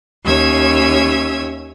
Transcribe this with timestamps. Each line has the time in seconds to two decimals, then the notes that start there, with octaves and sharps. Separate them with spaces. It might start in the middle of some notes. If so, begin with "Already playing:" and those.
0.23 D#2 C#4 C#5 E5 E6 G#6